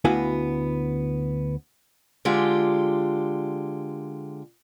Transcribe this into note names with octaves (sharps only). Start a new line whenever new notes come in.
D2 B3 E4 F#4 F5 G#5
D3 G#3 F4 G4